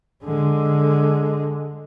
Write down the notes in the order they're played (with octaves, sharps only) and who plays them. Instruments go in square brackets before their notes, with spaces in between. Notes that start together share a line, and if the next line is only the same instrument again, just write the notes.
[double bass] D3 G#3